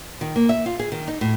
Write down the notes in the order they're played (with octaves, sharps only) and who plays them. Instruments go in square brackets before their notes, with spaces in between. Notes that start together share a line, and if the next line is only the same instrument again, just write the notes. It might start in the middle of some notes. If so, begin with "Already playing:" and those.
[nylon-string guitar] D#3
A#3
E5
F4
G#4
D#3
D#4
A2